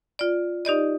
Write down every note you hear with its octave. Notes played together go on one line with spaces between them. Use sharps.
F4 D5
D#4 G4 D5 D#5